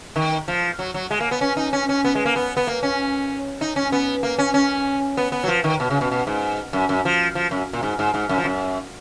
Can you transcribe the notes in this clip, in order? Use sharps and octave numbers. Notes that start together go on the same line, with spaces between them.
D#3
F3
F#3
F#3
G#3
A#3
B3
C#4
D#4
C#4
C#4
B3
G#3
A#3
B3
B3
A#3
C#4
D#4
C#4
B3
A#3
C#4
C#4
B3
B3
F#3
F3
D#3
B2
C#3
B2
B2
G#2
F#2
F#2
F3
F3
F#2
A#2
G#2
G#2
G#2
F#2
F3
F#2